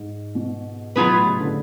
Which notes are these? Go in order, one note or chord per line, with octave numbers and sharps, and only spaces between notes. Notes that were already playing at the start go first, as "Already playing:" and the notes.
Already playing: G#2
B2
B2 F#3 B3 F4 G#4 B4
A2
C#3
D3